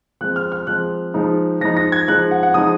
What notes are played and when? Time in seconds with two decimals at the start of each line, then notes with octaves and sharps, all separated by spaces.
0.21 F3 G#3 C4 F#6
0.36 F6
0.52 F6
0.67 F3 G#3 C4 F#6
1.14 F3 G#3 D#4
1.61 F3 G#3 D#4 A#6
1.77 A#6
1.92 G#6
2.08 F3 G#3 D#4 F#6
2.31 F#5
2.43 F#5
2.54 F3 G#3 D#4 D#6